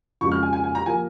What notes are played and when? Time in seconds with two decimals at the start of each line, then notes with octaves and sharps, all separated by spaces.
0.21 F2 C#3 F3 G#3 C#6
0.32 F6
0.43 G#5
0.53 G#5
0.64 G#5
0.75 A#5
0.86 F3 A#3 G#5